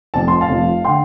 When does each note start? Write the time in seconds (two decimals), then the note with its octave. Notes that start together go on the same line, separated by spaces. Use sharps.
0.14 F1 F2 F3 A5
0.28 C6
0.41 F5 A5
0.49 F1 F2 F3
0.85 D3 G5 C6